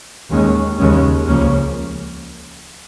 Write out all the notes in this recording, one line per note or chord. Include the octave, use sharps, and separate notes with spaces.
D#2 D#3 G#3 C#4
D#2 C#3 G#3 C#4
C#2 C#3 F3 A#3 C#4